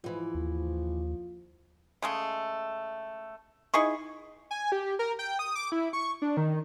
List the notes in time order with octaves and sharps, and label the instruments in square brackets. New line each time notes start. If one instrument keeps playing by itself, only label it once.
[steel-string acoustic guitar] G#2 E3 [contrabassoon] F3
[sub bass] D#2
[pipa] C#3 G#3 A3
D#4 E4 G#4 C#6
[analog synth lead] G#5
G4
A#4
G5
D#6
D6
E4
C#6
D4
D#3